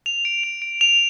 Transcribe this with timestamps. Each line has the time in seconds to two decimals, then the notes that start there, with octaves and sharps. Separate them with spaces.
0.06 F7
0.25 D7
0.44 F7
0.62 D7
0.81 F7